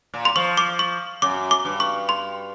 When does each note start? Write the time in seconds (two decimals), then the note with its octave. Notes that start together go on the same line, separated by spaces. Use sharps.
0.14 A#2
0.25 C6
0.36 F3 C#6
0.57 D6
0.79 C#6
1.22 F#2 D6
1.51 D6
1.65 G2
1.80 C#6
2.09 C6